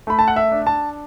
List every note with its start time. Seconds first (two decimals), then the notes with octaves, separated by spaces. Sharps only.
0.07 A3 B5
0.19 A5
0.28 F#5
0.36 E5
0.52 D4
0.67 A5